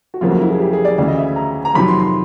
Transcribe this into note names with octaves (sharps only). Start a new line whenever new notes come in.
F#4
F1 F2 C#3 F#3 A#3 F4
F#4
E4
G#4
G4
G#4
D5
D2 C#3 E3 D5
D#5
E5
A#5
A#5
F2 C3 D#3 F#3 B5
C6
C6